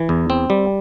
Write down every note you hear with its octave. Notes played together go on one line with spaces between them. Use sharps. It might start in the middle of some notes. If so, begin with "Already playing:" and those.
Already playing: E3
E2
C4
G3